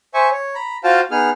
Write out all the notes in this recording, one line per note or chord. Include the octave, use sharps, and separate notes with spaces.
C5 E5 G#5 C#6
C#5
A#5 B5
F4 F#4 C5 F5 G5 A5
B3 D#4 G#4 F6